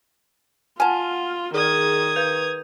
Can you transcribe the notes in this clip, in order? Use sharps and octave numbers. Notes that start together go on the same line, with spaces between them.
F4 F#5 G#5 A5 F6
D#3 G#4 D#6 G#6
B4 G6 F7